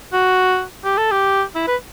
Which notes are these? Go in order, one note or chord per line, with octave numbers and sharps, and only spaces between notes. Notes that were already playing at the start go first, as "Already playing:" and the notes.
F#4
G4
A4
G4
E4
B4